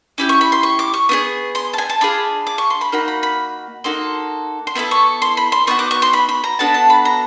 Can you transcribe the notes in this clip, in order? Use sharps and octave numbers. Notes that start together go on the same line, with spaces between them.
C#4 E4 G4 D6
C#6
B5
C6
C#6
D6
C#6
B3 D#4 G#4
C6
A5
G#5
A5
D4 F4 G#4 B5
D6
C#6
C6
B5
A#3 D#4 F#4 B5
B5
B5
A#3 D#4 F#4 A4 C6
C6
B3 E4 A4 B5
C#6
C6
B5
C6
B3 D#4 F#4 C#6
D6
C#6
C6
B5
B5
A#5
B3 D4 F#4 A4 A5
A5
B5
A#5